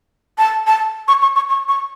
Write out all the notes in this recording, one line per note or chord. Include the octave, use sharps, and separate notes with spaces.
A5
A5
C#6
C#6
C#6
C#6
C#6